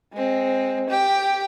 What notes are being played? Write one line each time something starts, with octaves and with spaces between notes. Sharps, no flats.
G#3 C4
G4 G5